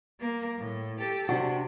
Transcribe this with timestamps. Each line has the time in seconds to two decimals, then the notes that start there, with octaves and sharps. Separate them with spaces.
0.21 A#3
0.58 A2
0.98 G4 A4
1.29 C3 D4 F#4